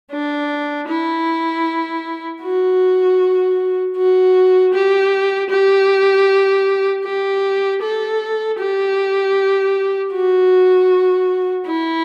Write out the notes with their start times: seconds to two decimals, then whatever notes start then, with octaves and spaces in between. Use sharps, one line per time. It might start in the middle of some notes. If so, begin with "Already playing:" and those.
0.11 D4
0.88 E4
2.42 F#4
3.96 F#4
4.73 G4
5.50 G4
7.04 G4
7.82 A4
8.58 G4
10.13 F#4
11.67 E4